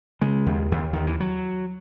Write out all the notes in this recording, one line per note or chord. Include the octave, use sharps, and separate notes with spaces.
C#3 G#3
D#2
D#2
D#2 D#3
E3
F#3